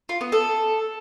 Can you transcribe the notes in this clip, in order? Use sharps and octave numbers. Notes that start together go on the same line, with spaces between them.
F4
B3
A4